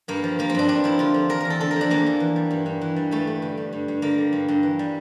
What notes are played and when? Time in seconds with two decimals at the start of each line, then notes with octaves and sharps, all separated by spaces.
0.08 G2 A#3
0.24 F3
0.39 F3 A#3
0.50 C4
0.55 G2 D4
0.68 G2 D4
0.84 F3 E4
0.99 D3 F4
1.14 F3
1.29 E2 A#4
1.40 E2 A#4
1.50 A4
1.60 D3 A4
1.71 A#4
1.76 F3 D4
1.90 E2 A#3
2.06 E2
2.20 E3
2.36 G3
2.51 G2
2.66 G2
2.81 E3
2.96 G3
3.11 G2 A3
3.27 G2
3.42 D3
3.57 G3
3.73 G2
3.88 G2
4.02 D3 A#3
4.18 G3
4.33 G2
4.48 G2
4.63 E3
4.79 G3